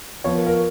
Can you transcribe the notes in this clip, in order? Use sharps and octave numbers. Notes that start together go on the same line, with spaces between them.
F3 B3 F4 C#5
A#4
A#4